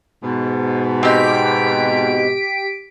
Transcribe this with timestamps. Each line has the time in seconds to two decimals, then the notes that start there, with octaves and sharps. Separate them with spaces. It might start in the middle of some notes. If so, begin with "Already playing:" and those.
0.23 G#2 B2
1.03 C4 D#4 G4 B6 D7